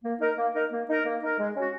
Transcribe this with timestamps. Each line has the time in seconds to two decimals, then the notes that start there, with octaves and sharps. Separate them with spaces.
0.04 A#3
0.20 D#4 A#4
0.37 A#3
0.54 D#4 A#4
0.72 A#3
0.88 D#4 A#4
1.05 A#3
1.22 D#4 A#4
1.39 G#3
1.55 C#4 F#4